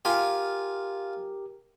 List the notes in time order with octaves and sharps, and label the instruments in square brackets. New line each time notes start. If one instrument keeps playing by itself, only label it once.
[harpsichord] F4 G#5 [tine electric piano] G4 A#4